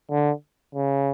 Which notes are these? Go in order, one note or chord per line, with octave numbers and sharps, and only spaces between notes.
D3
C#3